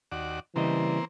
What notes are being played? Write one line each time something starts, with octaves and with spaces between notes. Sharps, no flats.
D#2 F#4 D5
C#3 E3 G3 A#3 C4 D#5